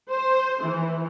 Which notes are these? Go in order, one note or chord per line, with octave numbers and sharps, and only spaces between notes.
C5
E3